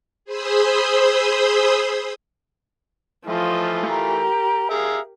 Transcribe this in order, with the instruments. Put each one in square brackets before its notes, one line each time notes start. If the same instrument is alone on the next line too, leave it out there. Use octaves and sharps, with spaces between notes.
[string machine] G#4 C5 B5 C6 D#6 E6
[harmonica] E3 A3 F4 [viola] F3 D#5
[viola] G4 A#4 [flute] A#5
[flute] G#4 [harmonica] E5 F5 A#5